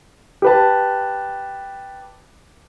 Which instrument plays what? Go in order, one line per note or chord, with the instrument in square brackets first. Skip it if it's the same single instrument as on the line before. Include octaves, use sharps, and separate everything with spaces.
[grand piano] G4 B4 A5